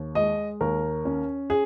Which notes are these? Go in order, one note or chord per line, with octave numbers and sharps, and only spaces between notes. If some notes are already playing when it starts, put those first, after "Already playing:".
Already playing: D#2
G#3 D#5
D#2 A#4
C#4
G#4